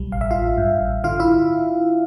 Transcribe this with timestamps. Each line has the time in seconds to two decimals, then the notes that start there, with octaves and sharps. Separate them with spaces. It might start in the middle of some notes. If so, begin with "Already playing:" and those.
Already playing: B1 G3
0.12 A1 F5
0.21 E5
0.31 A1 F4 F5
0.58 G2
0.81 A1
1.04 D3 F4 F5
1.20 E4 E5